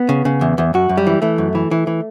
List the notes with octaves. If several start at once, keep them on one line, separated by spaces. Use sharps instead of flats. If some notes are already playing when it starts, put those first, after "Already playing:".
Already playing: B3
C#3
C#3
E2
E2
F#2 F#4
F#2
G3
E3
E3 A3
F#2
E3
E3
E3